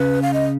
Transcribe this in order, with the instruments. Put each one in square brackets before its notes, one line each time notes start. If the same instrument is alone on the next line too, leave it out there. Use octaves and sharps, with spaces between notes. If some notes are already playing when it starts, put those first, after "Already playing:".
Already playing: [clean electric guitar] C#3 [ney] B4
[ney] F5
D#5